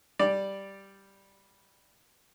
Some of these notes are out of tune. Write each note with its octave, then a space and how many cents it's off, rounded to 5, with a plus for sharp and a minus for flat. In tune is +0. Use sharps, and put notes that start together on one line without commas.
G3 +0 D5 +0